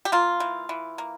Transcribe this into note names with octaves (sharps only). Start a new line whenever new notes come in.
G4
A#3 F4
E3
E3
A#3